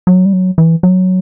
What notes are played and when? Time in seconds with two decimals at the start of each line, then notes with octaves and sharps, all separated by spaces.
0.07 F#3
0.25 G3
0.33 F#3
0.58 E3
0.83 F#3